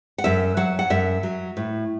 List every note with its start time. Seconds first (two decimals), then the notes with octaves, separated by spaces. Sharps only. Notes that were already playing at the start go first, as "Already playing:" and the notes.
0.18 F#5
0.24 F#2 E5
0.57 F#3 F#5
0.79 F#5
0.90 F#2 E5
1.23 F#3
1.57 A2